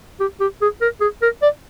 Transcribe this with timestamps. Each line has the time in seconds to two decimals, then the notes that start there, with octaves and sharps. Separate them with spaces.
0.20 G4
0.41 G4
0.61 G#4
0.81 A#4
1.01 G#4
1.22 A#4
1.42 D5